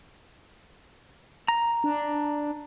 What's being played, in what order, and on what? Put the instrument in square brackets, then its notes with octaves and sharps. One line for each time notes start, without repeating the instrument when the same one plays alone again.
[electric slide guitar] A#5
[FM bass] D4